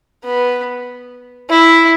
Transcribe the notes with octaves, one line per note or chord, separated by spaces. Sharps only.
B3
E4